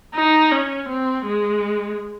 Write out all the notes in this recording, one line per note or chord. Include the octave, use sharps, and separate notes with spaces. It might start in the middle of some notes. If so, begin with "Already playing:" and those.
D#4
C#4
C4
G#3